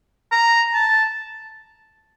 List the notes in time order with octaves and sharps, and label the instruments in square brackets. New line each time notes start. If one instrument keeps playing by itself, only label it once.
[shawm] A#5
A5